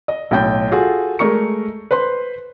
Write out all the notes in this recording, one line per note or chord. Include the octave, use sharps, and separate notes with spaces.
D#5
B1 A2 G5 G6
F4 F#4 G#4 A4
G#3 A3 A#4 C#6 C#7
B4 C5 C6